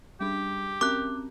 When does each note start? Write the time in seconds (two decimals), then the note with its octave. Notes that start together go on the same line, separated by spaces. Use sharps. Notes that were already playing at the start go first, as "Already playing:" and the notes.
0.20 G3 D4 G4
0.81 C4 C#4 A#4 D6 F#6